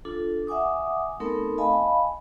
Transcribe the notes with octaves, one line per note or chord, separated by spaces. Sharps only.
D4 F4 A4
E5 F#5 G#5 D6 D#6
A3 B3 C4 D#4 A4 A#4
D#5 F5 G#5 A5 B5